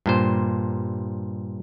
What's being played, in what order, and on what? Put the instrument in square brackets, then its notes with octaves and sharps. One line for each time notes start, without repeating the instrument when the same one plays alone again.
[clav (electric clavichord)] G2 A#2 C5